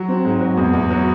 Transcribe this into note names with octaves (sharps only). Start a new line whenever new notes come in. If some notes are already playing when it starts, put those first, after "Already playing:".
Already playing: F#3
C4
G#2
F#3
E2
E2
F#3